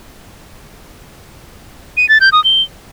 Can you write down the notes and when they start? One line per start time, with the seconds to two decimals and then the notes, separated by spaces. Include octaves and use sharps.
1.97 D#7
2.09 A6
2.21 G6
2.32 D#6
2.44 G7